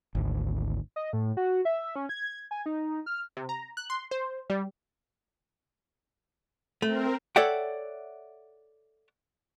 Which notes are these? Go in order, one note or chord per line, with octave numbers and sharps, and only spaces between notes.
G#1 D2
D#5
A2
F#4
E5
C#4
G#6
G#5
D#4
F6
C3
A#5
F#6
C6
C5
G3
A3 C4 A#4
A4 C#5 D5 E5 F#5 G5